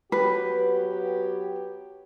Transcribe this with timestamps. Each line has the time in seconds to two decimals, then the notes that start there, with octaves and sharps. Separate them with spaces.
0.12 F#3 B3 G4 B4